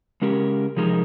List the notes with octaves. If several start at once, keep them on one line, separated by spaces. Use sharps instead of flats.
C#3 G#3 C#4 G4 A#4
C3 F3 G#3 D#4 A#4